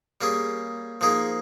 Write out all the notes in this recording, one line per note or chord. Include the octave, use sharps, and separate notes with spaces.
G3 A#3 C#4 G#4
F3 A#3 D#4 G#4